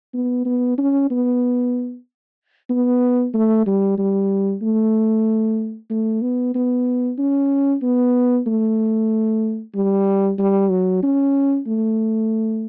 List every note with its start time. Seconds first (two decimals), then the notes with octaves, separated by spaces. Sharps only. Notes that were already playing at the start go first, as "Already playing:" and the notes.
0.14 B3
0.46 B3
0.78 C#4
1.11 B3
2.70 B3
3.34 A3
3.67 G3
3.98 G3
4.62 A3
5.90 A3
6.22 B3
6.55 B3
7.18 C#4
7.82 B3
8.47 A3
9.75 G3
10.39 G3
10.70 F#3
11.03 C#4
11.67 A3